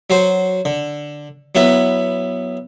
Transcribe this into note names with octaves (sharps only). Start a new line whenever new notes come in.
F#3 F#4 C5
D3
F#3 B3 E4 B4